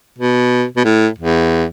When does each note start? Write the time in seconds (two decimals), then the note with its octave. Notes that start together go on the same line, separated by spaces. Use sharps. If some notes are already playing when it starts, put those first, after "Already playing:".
0.18 B2
0.76 B2
0.84 A2
1.18 E2